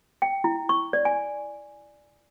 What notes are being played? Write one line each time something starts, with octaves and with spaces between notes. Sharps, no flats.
G5
E4
C#6
D5
G#5